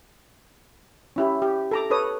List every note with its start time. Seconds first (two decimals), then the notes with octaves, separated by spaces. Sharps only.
1.16 C#4 E4 G4
1.42 G4
1.71 A4 A#5 D6
1.90 A4 B4 C#5 D#6